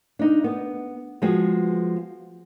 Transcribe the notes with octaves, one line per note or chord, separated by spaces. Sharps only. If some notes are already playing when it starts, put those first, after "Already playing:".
D4 D#4
B3
F3 G#3 B3 F#4 G#4